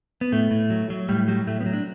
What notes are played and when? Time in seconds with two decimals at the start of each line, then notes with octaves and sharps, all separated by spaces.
0.21 B3
0.32 A2 A3
0.51 A2
0.70 F#3
0.90 F#3
1.09 A2 G3
1.28 F#3 G3
1.47 A2 A3
1.61 B3
1.66 F#3
1.73 D4